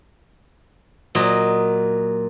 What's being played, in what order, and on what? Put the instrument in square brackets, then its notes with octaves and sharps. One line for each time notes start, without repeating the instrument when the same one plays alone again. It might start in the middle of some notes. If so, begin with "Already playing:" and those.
[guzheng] A#2 F#3 D#5